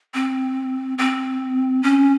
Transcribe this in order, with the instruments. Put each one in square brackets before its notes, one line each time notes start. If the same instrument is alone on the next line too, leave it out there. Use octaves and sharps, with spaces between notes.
[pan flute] C4
C4
C#4